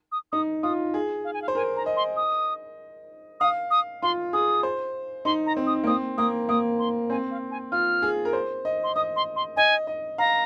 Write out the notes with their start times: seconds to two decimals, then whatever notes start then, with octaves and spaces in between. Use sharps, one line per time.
0.12 D#6
0.32 D#4 D#6
0.63 F4 D#6
0.94 G#4
1.25 F5
1.34 G#5
1.42 F5
1.48 C5
1.55 A#4 G#5
1.76 A#5
1.86 D#5
1.97 C6
2.17 D#6
3.40 F5 D#6
3.71 D#6
4.03 F4 C6
4.33 G#4 D#6
4.63 C5
5.25 D#4 C6
5.46 A#5
5.57 C4
5.67 D#6
5.84 A#3
5.87 C4 D#6
6.18 A#3 D#6
6.49 A#3 D#6
6.79 C6
7.10 C4 G#5
7.31 F5
7.51 G#5
7.72 F4 F6
8.02 G#4
8.25 A#4
8.33 C5
8.65 D#5
8.84 C6
8.95 D#5 D#6
9.16 C6
9.36 C6
9.57 D#5 G#5
9.87 D#5
10.18 F5 A#5